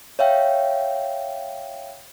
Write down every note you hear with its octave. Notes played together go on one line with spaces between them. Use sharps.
C#5 E5 F5 G5